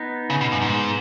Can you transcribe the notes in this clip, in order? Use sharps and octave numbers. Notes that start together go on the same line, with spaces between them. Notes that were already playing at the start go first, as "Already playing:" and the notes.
Already playing: B3 D#4
C#3
B2
F#2
G#2